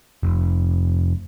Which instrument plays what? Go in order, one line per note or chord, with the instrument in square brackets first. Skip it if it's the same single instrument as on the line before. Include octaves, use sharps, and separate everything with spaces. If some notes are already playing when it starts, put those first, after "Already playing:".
[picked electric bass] F1